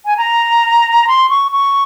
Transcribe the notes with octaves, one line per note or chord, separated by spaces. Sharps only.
G#5
A#5
C6
C#6
C#6